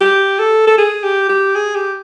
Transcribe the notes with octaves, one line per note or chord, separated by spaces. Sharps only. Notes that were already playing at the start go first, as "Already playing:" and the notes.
G4
A4
A4
G#4
G4
G4
G#4
G4